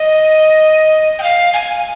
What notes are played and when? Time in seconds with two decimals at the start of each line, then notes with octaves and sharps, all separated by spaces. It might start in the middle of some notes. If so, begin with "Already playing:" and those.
Already playing: D#5
1.19 G5
1.23 F5
1.53 G#5